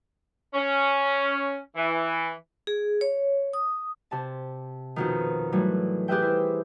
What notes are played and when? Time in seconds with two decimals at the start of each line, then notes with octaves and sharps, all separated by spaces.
0.54 C#4
1.76 E3
2.67 G#4
3.01 C#5
3.53 D#6
4.11 C3 A5
4.96 F2 B2 D#3
5.52 A2 E3 F#3 G3
6.08 G4 G#4 B4 E5 G5
6.22 E4 C5